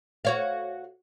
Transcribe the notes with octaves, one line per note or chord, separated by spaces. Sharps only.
F#4 C#5 F5